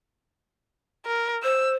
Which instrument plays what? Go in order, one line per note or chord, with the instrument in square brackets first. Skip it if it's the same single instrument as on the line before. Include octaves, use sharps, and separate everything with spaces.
[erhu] A#4
[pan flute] C5 [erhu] E6